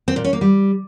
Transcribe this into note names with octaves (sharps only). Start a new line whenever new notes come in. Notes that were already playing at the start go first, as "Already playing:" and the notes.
C4
A#2
C#4
A#3
G3